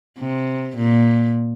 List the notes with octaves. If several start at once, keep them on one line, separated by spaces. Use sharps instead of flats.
C3
A#2